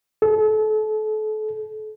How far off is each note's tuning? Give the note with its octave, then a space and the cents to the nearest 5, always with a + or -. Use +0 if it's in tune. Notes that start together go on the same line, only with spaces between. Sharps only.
A4 -35